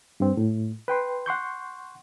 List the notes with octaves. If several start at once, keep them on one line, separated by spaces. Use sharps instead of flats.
G2 C4
A2
B4 G5 C6
F#5 C6 C#6 G6